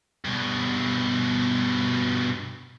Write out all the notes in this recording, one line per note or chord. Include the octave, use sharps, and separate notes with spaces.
G2 B2